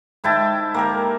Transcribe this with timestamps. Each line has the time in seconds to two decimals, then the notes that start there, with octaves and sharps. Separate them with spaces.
0.24 G#2 E4 G5 A5
0.74 A#3 G4 A#4